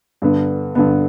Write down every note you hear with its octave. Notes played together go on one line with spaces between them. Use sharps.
G2 D3 B3
G2 D3 B3